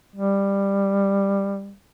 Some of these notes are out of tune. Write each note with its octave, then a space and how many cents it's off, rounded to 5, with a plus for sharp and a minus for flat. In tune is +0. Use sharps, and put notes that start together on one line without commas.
G3 +15